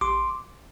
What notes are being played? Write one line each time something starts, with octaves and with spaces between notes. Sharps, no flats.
A1 C6 D6